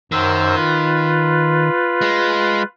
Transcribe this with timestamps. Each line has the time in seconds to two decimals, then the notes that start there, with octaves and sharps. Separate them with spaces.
0.12 F#2 D#3 C5 E6
0.56 F4 B4
2.01 G#3